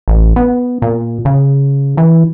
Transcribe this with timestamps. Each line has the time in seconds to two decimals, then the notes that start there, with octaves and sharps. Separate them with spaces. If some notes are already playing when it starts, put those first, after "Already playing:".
0.08 A1
0.36 B3
0.82 A#2
1.25 C#3
1.97 E3